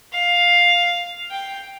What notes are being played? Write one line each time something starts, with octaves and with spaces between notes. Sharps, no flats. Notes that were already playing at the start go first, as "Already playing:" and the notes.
F5
G5